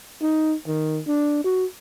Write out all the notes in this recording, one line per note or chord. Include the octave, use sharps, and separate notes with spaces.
D#4
D#3
D4
F#4